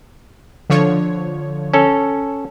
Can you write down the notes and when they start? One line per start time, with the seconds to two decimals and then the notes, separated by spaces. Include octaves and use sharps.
0.70 D3 F3 C#5
1.74 C#4 A4